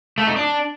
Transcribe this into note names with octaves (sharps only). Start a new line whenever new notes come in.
A3
D#4
D4